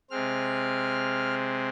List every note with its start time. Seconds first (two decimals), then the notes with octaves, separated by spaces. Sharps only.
0.10 C3 G#3 C4 F6